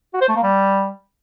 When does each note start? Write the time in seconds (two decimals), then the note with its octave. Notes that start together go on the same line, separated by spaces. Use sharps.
0.14 F#4
0.21 C5
0.28 A3
0.36 A#3
0.43 G3